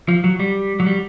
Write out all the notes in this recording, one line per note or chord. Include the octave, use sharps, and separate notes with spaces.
F3
F#3
G3
F#3
G3